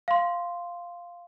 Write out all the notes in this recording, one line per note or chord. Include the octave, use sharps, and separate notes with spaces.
F5 C6